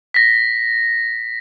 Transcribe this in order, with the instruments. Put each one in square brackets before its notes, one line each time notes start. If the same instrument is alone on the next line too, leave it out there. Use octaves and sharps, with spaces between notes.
[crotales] A#6 B6